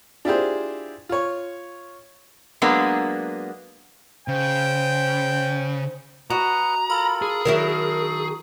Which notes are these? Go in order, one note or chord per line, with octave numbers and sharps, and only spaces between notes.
D4 E4 F4 G4 G#4 C5
F4 C#5
F#3 G#3 A#3 B3 D4
C#3 C5 G5
F#4 B4 D#5 F#5 A#5
F4 A4 A#4 B5
G#4
D#3 F#3 E4 A#4
A4